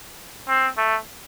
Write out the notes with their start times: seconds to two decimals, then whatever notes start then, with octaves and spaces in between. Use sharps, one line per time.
0.48 C4
0.77 A3